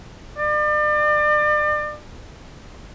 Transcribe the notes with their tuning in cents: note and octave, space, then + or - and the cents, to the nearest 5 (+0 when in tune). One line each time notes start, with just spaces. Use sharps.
D5 +35